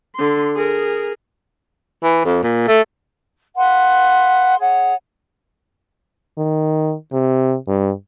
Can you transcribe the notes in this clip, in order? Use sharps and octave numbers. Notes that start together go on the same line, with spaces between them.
D3 C6
G#4 A#4
E3
F2
A#2
A3
B4 F5 F#5 C6
G#4 C#5 F#5
D#3
C3
G2